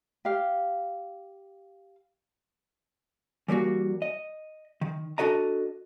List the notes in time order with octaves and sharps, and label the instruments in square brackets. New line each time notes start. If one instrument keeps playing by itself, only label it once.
[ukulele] G4 F5
[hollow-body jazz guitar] E3 G3 A#3 F#4
D#5
D#3
D4 F#4 A4 D#5 A#5